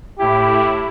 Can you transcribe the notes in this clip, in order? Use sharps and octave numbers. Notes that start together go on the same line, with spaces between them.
A2 E4 G4